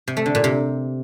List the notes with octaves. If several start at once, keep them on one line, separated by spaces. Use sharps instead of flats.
C3
A3
D3
A#2
C3